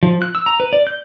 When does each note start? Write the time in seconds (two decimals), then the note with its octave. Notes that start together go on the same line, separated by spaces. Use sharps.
0.03 F3
0.22 F#6
0.35 E6
0.46 A#5
0.60 B4
0.73 D5
0.87 G6